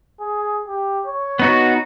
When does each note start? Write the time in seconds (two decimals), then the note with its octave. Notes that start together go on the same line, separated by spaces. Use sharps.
0.20 G#4
0.68 G4
1.07 C#5
1.39 B3 D#4 F#4